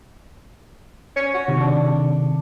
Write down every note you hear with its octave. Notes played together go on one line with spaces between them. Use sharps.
C#5
F#4
C3 D#3
D4